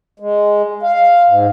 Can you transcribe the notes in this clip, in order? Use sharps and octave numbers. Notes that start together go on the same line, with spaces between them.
G#3
F5
G#2